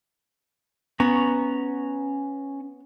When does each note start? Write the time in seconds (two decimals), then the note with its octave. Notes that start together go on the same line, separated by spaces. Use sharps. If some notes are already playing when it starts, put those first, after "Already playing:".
1.00 B3 C#4 A#5 C#6